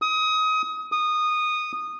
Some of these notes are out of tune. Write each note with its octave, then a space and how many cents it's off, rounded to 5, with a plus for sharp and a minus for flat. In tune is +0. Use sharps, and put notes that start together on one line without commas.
D#6 +25
D#6 -15